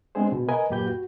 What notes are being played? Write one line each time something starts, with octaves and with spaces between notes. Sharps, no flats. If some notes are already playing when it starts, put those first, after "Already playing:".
G#3 B3 C4 D4 G#4 C5
B2
A#4 B4 D#5 G#5
F#2 A#2 A#3 G4 B4 G6
F#4